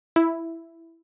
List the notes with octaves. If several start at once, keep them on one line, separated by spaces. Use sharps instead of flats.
E4